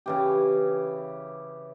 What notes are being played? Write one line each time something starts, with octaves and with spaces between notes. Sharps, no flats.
C#3 E3 G4